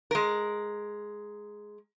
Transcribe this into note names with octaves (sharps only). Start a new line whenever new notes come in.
G#3 A#4